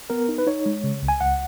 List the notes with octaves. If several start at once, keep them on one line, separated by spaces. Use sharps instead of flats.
B3 A#4
D#4
B4
D#4 C#5
G#3
C#3
C#2
G#5
C#2 F#5